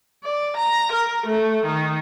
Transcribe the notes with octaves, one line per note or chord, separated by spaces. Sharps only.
D5
A#5
A#4
A3
D#3